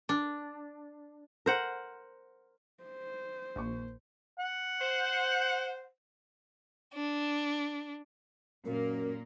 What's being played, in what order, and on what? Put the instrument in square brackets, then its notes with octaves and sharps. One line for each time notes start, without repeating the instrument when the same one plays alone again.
[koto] D4
[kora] A#4 C5 F#5
[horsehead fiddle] C5
[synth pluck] A#1 [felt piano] D#2 C#6
[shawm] F#5
[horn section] C5
[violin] D4
[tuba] F#2 [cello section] A#2 A#3 [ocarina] A#4